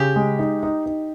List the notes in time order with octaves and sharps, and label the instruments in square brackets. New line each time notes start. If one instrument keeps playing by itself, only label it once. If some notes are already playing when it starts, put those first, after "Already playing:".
Already playing: [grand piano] C#3 [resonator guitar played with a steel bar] G4
[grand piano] G#3
D#4
D#4
D#4